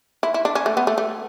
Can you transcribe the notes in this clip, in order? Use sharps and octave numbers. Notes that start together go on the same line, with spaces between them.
E4
E4
D4
C#4
A3
B3
A3
A3